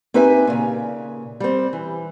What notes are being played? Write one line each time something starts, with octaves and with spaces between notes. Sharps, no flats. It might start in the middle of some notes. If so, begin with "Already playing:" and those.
C4 D#4 G4 B4 E5 G#5
A#2 C#3
G3 C4
E3